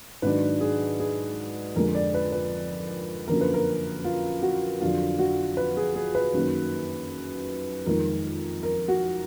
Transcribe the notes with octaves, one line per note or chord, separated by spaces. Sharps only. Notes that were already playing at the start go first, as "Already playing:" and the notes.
G#2 D#3 F#3 D4 B4
G#4
G#4
F2 D3 G#3 A#4
D5
B4
B4
F#2 D3 F3 A#3 A#4
B4
A#4
F4
F#4
F2 D3 F#3 D4 F4
F#4
B4
G#4
G#4
B4
F#2 D#3 F#3 A#3
F2 D#3 G#3 A#4
A#4
F#4